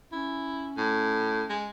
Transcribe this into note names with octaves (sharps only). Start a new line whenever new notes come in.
C#4 E4
A2
G#3